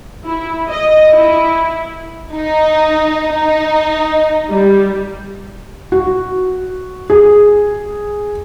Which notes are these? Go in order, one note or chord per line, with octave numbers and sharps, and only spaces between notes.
E4
D#5
E4
D#4
D#4
G3
F#4
G#4